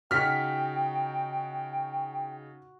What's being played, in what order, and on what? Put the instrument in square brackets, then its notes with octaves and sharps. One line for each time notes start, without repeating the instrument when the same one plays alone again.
[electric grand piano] C#3 D#4 [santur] F#4 [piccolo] G5 [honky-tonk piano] F6 B6